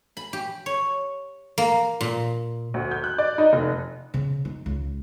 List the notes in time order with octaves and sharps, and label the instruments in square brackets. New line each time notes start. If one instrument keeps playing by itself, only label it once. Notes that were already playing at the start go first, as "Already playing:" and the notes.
[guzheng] B5
G4
C#5
A#3
A#2
[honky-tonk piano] D2
G6
F#6
D5
D#4
F1
[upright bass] C#3
D#4
C#2